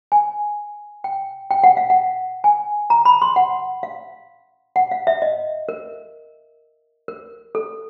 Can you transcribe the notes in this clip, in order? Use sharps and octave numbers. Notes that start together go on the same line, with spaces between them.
G#5
G5
G5
F#5
F5
F#5
G#5
A#5
B5
C6
F#5
F5
F#5
F5
E5
D#5
A#4
A#4
A4